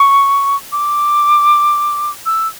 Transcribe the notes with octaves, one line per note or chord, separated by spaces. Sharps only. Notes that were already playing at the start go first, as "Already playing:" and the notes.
Already playing: C#6
D6
E6